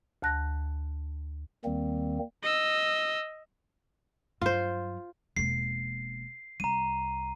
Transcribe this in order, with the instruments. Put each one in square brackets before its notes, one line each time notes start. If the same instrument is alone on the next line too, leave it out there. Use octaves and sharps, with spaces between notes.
[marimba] D2 A5 F#6 A#6
[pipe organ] D#2 D#3 G3 A#3 C4
[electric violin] D#5 E6
[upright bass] G2 F#3 [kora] F4 C5
[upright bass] E1 A#3 [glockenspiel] C7
[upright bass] C2 [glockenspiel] A#5 D#7